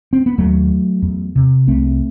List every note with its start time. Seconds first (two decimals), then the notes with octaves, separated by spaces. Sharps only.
0.13 C4
0.26 B3
0.38 D#2 F#3 A3
1.02 E2
1.36 C3
1.67 C2 A3 C4